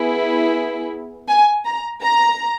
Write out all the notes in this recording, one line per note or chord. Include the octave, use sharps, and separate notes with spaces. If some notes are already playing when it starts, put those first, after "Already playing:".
Already playing: B3 E4 G#4
G#5
A#5
A#5